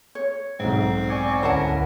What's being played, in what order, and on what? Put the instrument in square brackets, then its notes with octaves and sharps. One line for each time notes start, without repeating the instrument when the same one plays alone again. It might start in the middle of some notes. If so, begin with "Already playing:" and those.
[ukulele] C#5
[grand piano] B1 G#2 [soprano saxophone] C4
[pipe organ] D5 G#5 C#6
[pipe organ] D2 C#4 B4 [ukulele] E4 F#5 A5 [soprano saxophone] A#4